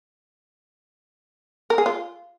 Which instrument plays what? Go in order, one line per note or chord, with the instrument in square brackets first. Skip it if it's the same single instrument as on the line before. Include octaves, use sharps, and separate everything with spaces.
[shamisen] A#4
G#4
F4